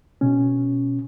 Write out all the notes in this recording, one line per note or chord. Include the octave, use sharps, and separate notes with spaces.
B2 C#4